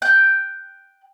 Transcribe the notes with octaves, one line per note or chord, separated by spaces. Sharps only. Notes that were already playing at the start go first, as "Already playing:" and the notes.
G5 F#6 G6